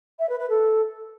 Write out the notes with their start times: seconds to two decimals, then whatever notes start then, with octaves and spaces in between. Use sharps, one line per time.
0.19 E5
0.29 B4
0.39 B4
0.49 A4